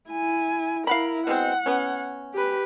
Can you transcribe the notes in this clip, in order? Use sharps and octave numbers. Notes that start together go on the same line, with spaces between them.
E4 G#5
E4 A#4 F5 F#5 B5
B2 G#3 C4 F#5
B3 C#4
G4 B4